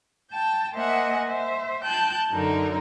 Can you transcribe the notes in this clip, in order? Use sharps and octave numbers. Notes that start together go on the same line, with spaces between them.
G5 A5
A#3 C5 D#5 E5 F#5 G#5
C5 E5
G5 A5 F#6 G6
F#2 D3 D#4 A#4